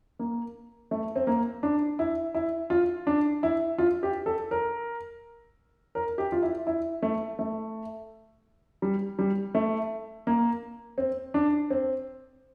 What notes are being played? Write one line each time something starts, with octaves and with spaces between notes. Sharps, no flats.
A#3
A3
C4
A#3
D4
E4
E4
F4
D4
E4
F4
G4
A4
A#4
A#4
G4
F4
E4
E4
A3
A3
G3
G3
A3
A#3
C4
D4
C4